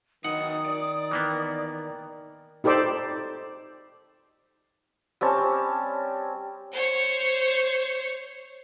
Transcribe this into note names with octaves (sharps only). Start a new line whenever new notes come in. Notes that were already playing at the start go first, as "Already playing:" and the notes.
D#3 F#3 D#4 F#5 D#6
D5
E3 A#3 B3
D#4 G4 A4 C5 D5
G3 C4 C#4 A5
C5 C#5